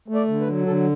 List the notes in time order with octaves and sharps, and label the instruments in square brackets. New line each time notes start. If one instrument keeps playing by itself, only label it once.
[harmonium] A3
D5
D3
B4
F#3
D3 A4